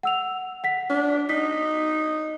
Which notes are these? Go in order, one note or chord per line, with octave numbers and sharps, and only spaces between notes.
F#5 E6 F7
F#5 B6
D4
D#4 B6